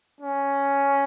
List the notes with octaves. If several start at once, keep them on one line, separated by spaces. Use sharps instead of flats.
C#4